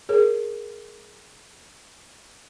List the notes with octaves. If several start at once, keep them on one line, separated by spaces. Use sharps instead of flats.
G#4 A#4 C#5